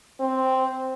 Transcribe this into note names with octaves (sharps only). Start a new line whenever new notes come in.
C4